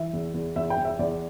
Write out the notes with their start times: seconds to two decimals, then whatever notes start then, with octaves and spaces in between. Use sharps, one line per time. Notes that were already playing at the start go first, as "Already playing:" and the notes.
Already playing: E3 E5
0.13 E2
0.34 E2
0.56 E2 E5
0.70 G5
0.77 E2
0.85 E5
0.99 E2 D5